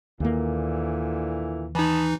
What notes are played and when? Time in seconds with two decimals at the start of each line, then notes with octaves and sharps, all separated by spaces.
0.20 D#2 A#2 D3 E3 A#3
1.75 E3 D#4 D#5 A5 B5